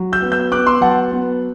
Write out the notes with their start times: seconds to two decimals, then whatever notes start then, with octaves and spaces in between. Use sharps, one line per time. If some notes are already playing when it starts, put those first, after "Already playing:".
Already playing: F#3
0.13 E6 G6
0.22 B3
0.32 E6 G6
0.51 B3 D6 F#6
0.67 C6 E6
0.81 F#3 F#5 A5
1.12 B3